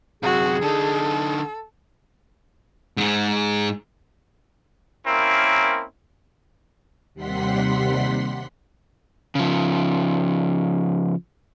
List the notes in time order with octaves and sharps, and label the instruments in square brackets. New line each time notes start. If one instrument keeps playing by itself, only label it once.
[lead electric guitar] F#2 C3 [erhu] F#4 [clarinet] G#4
[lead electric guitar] D3 D#4 [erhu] A4
[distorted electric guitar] G#2 G#3
[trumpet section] A#3 C4 C#4 E4 A#4
[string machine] D#2 C3 G3 F#5 C6 B6
[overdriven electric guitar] C#3 F3